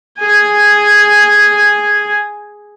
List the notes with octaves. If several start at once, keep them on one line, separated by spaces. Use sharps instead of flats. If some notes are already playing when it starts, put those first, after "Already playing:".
G#4 G#5